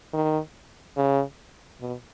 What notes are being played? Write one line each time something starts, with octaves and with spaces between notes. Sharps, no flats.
D#3
C#3
B2